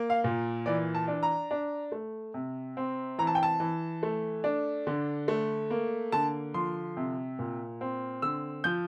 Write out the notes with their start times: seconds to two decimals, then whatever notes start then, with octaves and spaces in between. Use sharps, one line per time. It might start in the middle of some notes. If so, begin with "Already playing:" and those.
Already playing: A#3
0.10 F5
0.24 A#2
0.66 E3 D5
0.95 A5
1.08 D4
1.23 A#5
1.51 D4
1.92 A3
2.34 C3
2.77 C4
3.18 E3 A#5
3.27 A5
3.35 G5
3.43 A5
3.60 E3
4.03 A3
4.44 D4
4.87 D3
5.28 A3
5.70 A#3
6.12 D3 A5
6.54 F3 C6
6.97 C3
7.39 A#2
7.81 C4
8.22 D3 E6
8.64 F3 G6